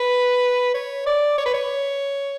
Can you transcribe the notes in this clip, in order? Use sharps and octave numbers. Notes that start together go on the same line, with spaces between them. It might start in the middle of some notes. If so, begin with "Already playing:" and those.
Already playing: B4
C#5
D5
C#5
B4
C#5